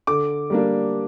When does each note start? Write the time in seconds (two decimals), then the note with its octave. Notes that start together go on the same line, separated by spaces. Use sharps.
0.07 D3 D6
0.50 G3 A#3 D4